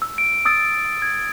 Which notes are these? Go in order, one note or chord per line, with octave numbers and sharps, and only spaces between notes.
E6
D7
D#6 E6 A6 D7
G#6